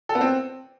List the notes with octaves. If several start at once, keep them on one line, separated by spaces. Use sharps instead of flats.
A4
B3
C4